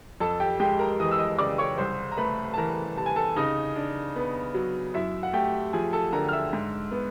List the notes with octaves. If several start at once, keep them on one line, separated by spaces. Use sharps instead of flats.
F2 A4 A5
G4 G5
G#3 G4 G5
A#4 A#5
E3 D#5 D#6
E6
D#5 D#6
C#3 D5 D6
C#5 C#6
C2 C5 C6
A#5
A3 B4 B5
A5
E3 A#4 A#5
C3 A5
G#5
A4 A5
C#3 D#4 D#5
D4
B3
F#3
F#2 E4 E5
F#5
A3 G4 G5
F3 G#4 G#5
A4 A5
D3 A#4 A#5
F6
E5 E6
G#2
B3